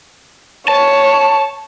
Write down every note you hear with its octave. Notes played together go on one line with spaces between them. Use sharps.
C#5 A5